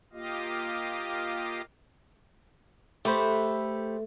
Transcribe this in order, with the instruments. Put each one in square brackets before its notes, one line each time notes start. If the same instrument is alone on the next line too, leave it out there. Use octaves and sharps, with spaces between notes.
[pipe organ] A#3 F4 G4 D#5 F5
[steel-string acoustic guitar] A3 [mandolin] G4 B4 C5